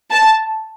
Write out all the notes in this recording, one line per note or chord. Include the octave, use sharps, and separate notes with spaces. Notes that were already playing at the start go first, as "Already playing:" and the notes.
A5